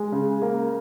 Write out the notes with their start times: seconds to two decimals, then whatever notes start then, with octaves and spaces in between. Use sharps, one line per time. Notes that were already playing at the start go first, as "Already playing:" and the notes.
Already playing: G#3
0.12 C#3
0.42 A#3